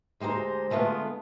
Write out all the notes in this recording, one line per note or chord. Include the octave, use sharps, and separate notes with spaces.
D2 G#3 G4 C5 A#5
D3 G#3 A3 B3 F4